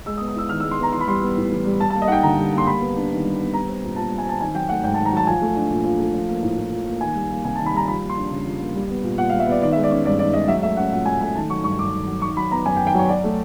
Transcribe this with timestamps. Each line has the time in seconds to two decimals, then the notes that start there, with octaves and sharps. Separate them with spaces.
0.06 G#3 E6
0.17 D#6
0.20 B3
0.28 D#6
0.35 E4 E6
0.49 D#3 F6
0.60 E6
0.63 G#3
0.71 C6
0.79 B3 A#5
0.92 E3 C6
1.01 B5
1.08 G3 C6
1.22 B3
1.37 A2
1.51 E3
1.65 G3
1.80 G3 A5
1.90 A5
1.94 A#3
2.02 D#5
2.08 D#4 F#5 G5
2.23 D3 A#5
2.38 G3
2.53 A#3 C6
2.67 G3 B5
2.81 B3
2.96 D4
3.11 D#3
3.25 G3
3.40 B3
3.53 G3 A#5
3.69 C4
3.83 A#2
3.96 A#2 A5
4.11 G3
4.18 G#5
4.26 C4 A5
4.41 D#3 G#5
4.54 F#3 G5
4.69 A3 F#5
4.83 G#2 G5
4.94 A5
4.99 D#3
5.05 A#5
5.13 F#3 A5
5.27 F3 G#5
5.41 A3
5.56 D4
5.70 A#2
5.85 F3
6.00 A3
6.14 F3
6.29 A#3
6.43 A2
6.58 A2
6.72 F3
6.86 A#3
7.01 D#3 G#5
7.15 G3
7.29 A#3
7.44 C3 G#5
7.55 A5
7.58 D#3
7.66 B5
7.73 G3 A#5
7.88 F3 B5
8.02 A#3
8.09 C6
8.17 D4
8.32 C#3
8.46 F3
8.60 A#3
8.74 G3
8.89 B3
9.03 A#2
9.18 A#2 F#5
9.29 F5
9.33 G3
9.39 E5
9.46 B3 D5
9.62 D#3 D5
9.72 E5
9.76 G#3
9.83 D5
9.91 C#4
10.05 G2 D5
10.19 D#3 D5
10.33 G#3 D#5
10.48 F#3 E5
10.63 A3 E5
10.77 C#4 F#5
10.92 A#2 F#5
11.06 F#3 G#5
11.21 A3 G#5
11.35 D#3 A5
11.50 F#3 C#6
11.64 G2 C#6
11.79 G2 D6
11.94 D#3
12.07 F#3
12.22 D#3 C#6
12.37 F#3 B5
12.51 B3 A#5
12.66 F#2 G#5
12.76 G5
12.81 D#3
12.87 G5
12.95 F#3 C#5
13.09 F#3 D5
13.24 A3